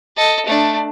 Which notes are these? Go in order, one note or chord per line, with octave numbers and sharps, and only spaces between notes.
A4 D#5
A3 D4